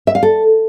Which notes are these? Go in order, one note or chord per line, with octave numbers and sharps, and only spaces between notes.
E5
F5
A4